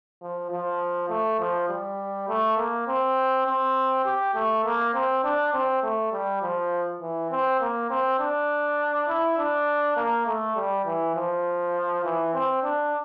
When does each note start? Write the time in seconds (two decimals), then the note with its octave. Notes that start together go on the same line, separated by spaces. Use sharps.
0.21 F3
0.51 F3
1.10 A3
1.40 F3
1.69 G3
2.28 A3
2.57 A#3
2.88 C4
3.46 C4
4.05 G4
4.35 A3
4.65 A#3
4.94 C4
5.24 D4
5.53 C4
5.83 A3
6.12 G3
6.42 F3
7.01 E3
7.31 C4
7.60 A#3
7.90 C4
8.19 D4
9.08 E4
9.38 D4
9.97 A#3
10.27 A3
10.56 G3
10.85 E3
11.15 F3
12.04 E3
12.34 C4
12.63 D4